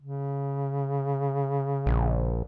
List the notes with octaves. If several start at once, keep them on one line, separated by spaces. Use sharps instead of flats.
C#3
A#1